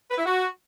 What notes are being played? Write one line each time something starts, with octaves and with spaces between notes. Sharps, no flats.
B4
E4
F#4